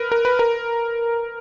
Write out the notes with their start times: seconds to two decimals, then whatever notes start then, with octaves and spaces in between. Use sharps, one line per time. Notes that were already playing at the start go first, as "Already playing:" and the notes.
Already playing: A#4 B4
0.12 A#4
0.25 B4
0.39 A#4